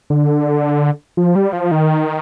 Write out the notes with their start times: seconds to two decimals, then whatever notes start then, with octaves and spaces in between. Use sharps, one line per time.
0.10 D3
1.17 F3
1.35 G3
1.53 F3
1.71 D#3